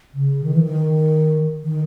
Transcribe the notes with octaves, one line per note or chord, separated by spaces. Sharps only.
C#3
D#3
E3
D#3
D#3